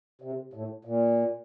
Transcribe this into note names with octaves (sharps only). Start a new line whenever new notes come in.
C3
A2
A#2